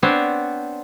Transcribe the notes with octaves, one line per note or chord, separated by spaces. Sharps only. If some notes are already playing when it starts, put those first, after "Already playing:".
B3 C4 D4 C5 C#5